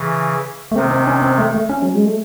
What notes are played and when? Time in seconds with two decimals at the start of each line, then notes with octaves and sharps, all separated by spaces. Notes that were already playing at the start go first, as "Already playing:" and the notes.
Already playing: C#3 E3
0.72 A3
0.76 C3 D#3 C4
0.91 C4
1.07 C#4
1.22 C4
1.38 A3
1.54 A3
1.69 C#4
1.83 F#3
1.94 G#3
2.05 A3